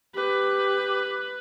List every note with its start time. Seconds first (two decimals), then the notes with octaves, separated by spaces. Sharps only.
0.15 G4 B4